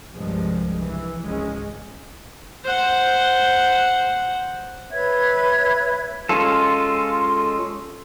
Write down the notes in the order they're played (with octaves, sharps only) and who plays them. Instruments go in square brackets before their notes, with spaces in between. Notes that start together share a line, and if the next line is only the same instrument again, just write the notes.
[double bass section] C2 G2 F3 G#3
E3
G#1 C#2 G#3 C#4
[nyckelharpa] C5 F#5
[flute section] B4 C#5 E5 G#6
[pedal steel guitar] G#3 C#4 F4 A4